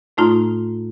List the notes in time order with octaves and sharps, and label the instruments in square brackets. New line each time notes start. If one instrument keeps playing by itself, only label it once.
[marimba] A2 A3 D#4 F4 A#5 C6